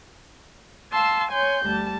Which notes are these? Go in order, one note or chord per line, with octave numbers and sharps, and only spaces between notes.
F5 A5 C6 E6
C#5 G#5 C6 G6
D2 G3 A5